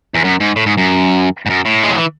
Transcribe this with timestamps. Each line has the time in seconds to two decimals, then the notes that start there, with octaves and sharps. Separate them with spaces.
0.15 E2
0.25 F#2
0.41 G#2
0.56 A2
0.66 G#2
0.77 F#2
1.46 G#2
1.50 F#2
1.65 A2
1.83 G#3
1.90 F#3
1.97 E3